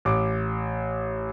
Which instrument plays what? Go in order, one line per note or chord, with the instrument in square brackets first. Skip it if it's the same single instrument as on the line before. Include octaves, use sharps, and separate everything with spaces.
[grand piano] A1 D6